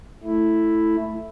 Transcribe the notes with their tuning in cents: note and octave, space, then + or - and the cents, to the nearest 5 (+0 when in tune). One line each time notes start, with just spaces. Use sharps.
A3 +0 E4 +0